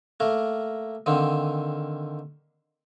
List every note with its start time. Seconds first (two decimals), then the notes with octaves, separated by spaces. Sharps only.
0.20 A3 A#3 A#4
1.06 D3 D#3 A#3 C4